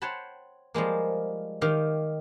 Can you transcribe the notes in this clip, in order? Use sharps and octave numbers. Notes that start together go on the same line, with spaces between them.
C5 C#5 F#5 G5 A5 B5
F3 G3 G#3 A#3
D#3 G4 F5